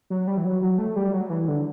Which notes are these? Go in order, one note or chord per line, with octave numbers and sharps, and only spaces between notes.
F#3
G3
E3
F#3
F#3
A3
G3
F#3
E3
D3